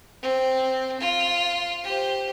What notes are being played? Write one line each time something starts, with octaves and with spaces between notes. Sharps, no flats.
C4
F4
G4 C5